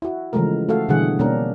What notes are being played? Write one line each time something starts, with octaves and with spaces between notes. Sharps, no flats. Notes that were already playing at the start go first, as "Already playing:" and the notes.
E4 F#4
C#3 E3 F3 G#3 A3 A#4
A3 F#4 A4 F5
B2 D3 E3 G3 G#4 F#5
B2 G3 A#3 C#4 D4 A#4